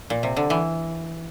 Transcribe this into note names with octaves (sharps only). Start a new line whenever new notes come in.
A#2
C3
D3
E3